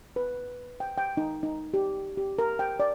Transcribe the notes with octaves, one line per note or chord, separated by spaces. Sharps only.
B4
G5
G5
D#4
D#4
G4
G4
A#4
G5
D5